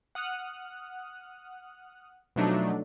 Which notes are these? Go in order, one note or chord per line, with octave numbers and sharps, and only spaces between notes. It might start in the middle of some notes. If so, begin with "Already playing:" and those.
F#5 D#6 F6 F#6
B2 F3 F#3 A3 D4 D#4